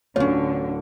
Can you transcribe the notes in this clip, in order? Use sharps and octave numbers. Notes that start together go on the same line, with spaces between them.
D1 D3 C#4 F4 C#5